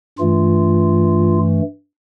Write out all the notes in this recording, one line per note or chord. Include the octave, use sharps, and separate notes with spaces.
G2 E3 A3 F4